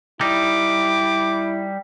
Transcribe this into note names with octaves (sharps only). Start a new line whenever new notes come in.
G3 D#4 E4 D6